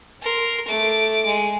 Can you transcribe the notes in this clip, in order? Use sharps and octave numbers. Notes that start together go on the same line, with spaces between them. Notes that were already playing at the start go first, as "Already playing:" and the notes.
A#4 C6
A3 D6
G#3